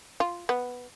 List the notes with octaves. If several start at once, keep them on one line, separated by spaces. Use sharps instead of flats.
F4
B3